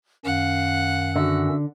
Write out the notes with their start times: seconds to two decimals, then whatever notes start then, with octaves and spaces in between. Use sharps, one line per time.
0.25 F#2 D#3 C#4 F5 F#5
1.16 D3 F#4 E5 E6